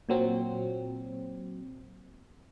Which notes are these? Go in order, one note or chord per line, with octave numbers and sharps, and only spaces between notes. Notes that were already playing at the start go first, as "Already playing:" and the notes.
A#2 F#3 C4